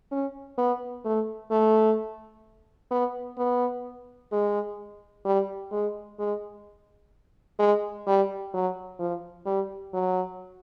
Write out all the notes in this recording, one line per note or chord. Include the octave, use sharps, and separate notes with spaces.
C#4
B3
A3
A3
B3
B3
G#3
G3
G#3
G#3
G#3
G3
F#3
F3
G3
F#3